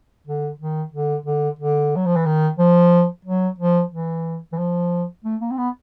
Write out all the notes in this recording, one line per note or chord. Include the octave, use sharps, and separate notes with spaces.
D3
D#3
D3
D3
D3
F#3
F3
E3
D#3
F3
F#3
F3
E3
E3
F3
A3
A#3
C4
B3